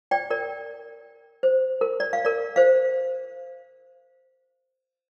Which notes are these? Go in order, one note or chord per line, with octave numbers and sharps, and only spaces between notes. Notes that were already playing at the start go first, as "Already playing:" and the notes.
D5 G5
A#4 D5
C5
A#4
D5
F5
A#4 D5
C5 F5